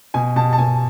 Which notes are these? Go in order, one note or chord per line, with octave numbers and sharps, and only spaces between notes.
B2 G#5
B2 A5
A5
B2 G#5